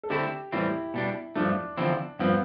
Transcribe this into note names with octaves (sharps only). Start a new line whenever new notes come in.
A4
D3 A3 C4 E4 G4
A2 E3 G3 C4 E4
B2 G3 D4
G2 F3 A3 D4
E2 D3 F3 C4 E4
G2 F3 B3 C4